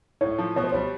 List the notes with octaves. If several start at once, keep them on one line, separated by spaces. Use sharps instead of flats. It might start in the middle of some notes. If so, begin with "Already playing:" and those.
A2 C#5
F3
B2 C#5
C5
G3 C#5